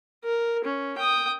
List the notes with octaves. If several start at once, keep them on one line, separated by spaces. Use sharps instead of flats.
A#4
C#4
G5 D#6